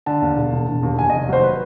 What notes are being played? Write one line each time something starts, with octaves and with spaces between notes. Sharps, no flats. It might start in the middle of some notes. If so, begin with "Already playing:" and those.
D3 A5
D#2
E1
E1
E1
D#2
D#2 G#5
F1 D#5
F#3 C5
B4